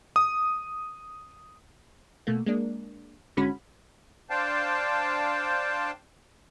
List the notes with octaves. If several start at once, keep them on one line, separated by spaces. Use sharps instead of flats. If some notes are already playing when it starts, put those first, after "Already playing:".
D#6
B2 A3 A#3
G#3 A#3 D4
G#1 D3 G#3 C#4 F#4 B5
D4 C5 F5 G5 A5